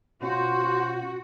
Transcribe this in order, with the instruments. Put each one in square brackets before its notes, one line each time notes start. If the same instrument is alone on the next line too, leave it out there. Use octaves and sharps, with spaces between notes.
[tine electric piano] B2 C#4 F4 [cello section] F#4 [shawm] C5